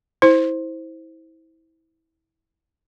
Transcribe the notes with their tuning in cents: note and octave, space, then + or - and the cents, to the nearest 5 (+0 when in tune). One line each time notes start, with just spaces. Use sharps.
E4 -25 C5 +0